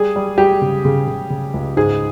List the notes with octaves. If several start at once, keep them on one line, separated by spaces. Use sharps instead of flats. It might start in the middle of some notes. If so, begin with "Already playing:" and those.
Already playing: G3 G#4
G3
G3 G4
C#3
C#3
C#3
C#3
C#2
G#2 G#4